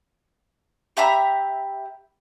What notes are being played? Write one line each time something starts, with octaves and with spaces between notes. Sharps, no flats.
G4 E5 A#5 B5